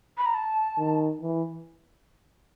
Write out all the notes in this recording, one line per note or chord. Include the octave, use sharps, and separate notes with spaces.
B5
A#5
A5
D#3
E3